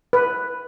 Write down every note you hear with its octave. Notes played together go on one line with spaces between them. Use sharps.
B4